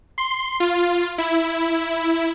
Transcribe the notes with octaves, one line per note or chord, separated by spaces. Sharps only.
C6
F4
E4